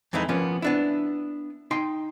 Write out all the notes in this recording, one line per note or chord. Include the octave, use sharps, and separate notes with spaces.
F2 E3 G#3 D#4 E4
F3 A#3 B3 C#4
B3 D4 E4
D#4 G5 C6